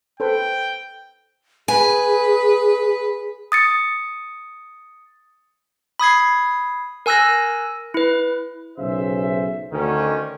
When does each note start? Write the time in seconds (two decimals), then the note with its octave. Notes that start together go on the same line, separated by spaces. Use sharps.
0.20 A4 B4 C5 G5
1.68 G#4 B4 G#5
3.52 D#6 A6 C#7
6.00 B5 D#6 G#6 C7
7.06 A#4 G#5 E6 F#6 A#6
7.94 E4 B4
8.78 B1 C#3 G#4 C5 E5
9.72 D2 D3 D#3 C#4